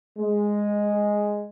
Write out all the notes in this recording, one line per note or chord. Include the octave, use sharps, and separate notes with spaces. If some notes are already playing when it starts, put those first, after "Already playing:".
G#3